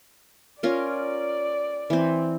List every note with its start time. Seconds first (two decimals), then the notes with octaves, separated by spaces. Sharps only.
0.63 C#4 F4 A#4 D5
1.90 E3 C4